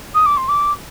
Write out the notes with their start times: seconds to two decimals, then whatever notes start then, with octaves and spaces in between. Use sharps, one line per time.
0.14 D#6
0.26 D6
0.37 C6
0.48 D6